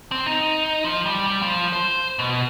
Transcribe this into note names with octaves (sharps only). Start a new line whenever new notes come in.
C4
D#4
F3
G3
G3
F3
C5
B2